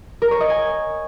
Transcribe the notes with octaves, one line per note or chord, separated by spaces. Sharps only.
A#4
C#5
D#5
G#5